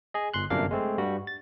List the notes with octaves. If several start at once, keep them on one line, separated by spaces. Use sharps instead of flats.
G#4 D#5
G1 C6 F#6
G1 F#2 C3 A#3 D4 F5
G#3 A3 C4
G2 G3 F#4
A6